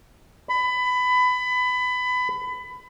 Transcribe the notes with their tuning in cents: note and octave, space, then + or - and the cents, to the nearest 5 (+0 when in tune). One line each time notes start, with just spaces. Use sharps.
B5 +20